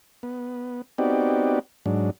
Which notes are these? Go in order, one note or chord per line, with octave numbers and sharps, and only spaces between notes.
B3
B3 C4 D#4 F#4 G4 D5
G#2 F#3 D4